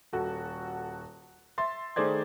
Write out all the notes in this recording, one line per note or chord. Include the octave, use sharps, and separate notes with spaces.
D#1 F#4 A4
E5 C6 A6
D#3 A3 G#4 C5 D5 G#6